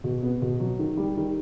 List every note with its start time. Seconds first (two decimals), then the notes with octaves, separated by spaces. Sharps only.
0.04 B2
0.23 B3
0.42 B2
0.60 F#3
0.79 D#3
0.97 G3
1.17 D#3